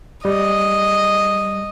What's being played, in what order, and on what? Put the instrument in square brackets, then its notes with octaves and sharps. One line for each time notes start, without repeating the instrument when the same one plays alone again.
[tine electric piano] G3 [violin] D#5